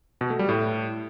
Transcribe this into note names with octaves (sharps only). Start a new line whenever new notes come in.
B2
A3
G3
A2